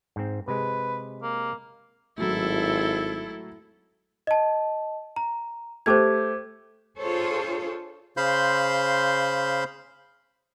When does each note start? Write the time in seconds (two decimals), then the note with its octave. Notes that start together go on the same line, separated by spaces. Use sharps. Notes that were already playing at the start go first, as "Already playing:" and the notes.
0.16 G#2 C4
0.48 C3 G#3 B4
1.23 A#3
2.18 G#1 A2 F#3 E4 A4
4.27 D#5 A5
5.16 A#5
5.86 A3 G4 C5 D6 G#6
6.99 D4 F4 G#4 A4 C5 C#5
8.17 C#3 C5 F5 B5 C6 G6